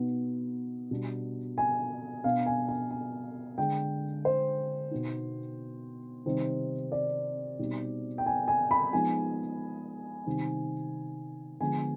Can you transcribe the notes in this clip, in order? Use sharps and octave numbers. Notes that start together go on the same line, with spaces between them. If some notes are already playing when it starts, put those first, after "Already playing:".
Already playing: B2 B3 D#4
B2 G3 B3 D4
G#5
B2 B3 D4 F5
G#5
G#5
G#5
D3 G#3 D4 G5
C5
B2 B3 D#4
C3 D#3 G3 C4 D#4
D5
B2 G3 C4 D#4
G5
G#5
G#5
B5
F3 G#3 B3 D#4 G#5
C3 D#3 G3 C4
D3 F3 G#3 B3 G#5